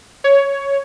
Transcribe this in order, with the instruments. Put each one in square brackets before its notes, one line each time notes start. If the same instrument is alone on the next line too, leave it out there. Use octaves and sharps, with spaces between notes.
[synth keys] C#5